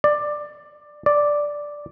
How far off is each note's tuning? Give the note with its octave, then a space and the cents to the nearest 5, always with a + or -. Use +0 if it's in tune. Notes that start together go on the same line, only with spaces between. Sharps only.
D5 +15
D5 +0